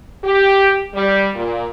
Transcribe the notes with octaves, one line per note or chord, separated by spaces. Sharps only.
G4
G3
A#2